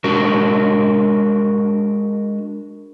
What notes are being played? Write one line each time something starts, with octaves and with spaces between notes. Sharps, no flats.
G#3 D4 F#4 A#4